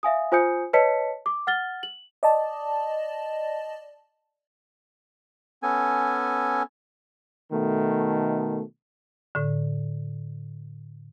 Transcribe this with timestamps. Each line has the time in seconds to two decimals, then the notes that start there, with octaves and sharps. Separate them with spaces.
0.03 E5 F5 G#5 D#6
0.32 F4 C5 G#5 D#6 G6 C#7
0.73 B4 C#5 D#5 A5 B6 C#7
1.26 D6
1.47 F#5 F6 A6 G7
1.83 F#7
2.23 D5 D#5 A5
5.63 B3 C#4 A4 G#5
7.52 B2 D#3 A3
9.35 A2 D3